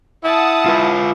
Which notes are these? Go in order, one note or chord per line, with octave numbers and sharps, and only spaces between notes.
E4 F#5 A5 D#6
F4 B4